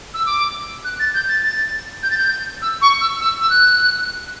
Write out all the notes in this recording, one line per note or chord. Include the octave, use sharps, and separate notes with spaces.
E6
D6
F#6
A6
G6
A6
A6
G6
A6
G6
E6
C#6
E6
E6
E6
F#6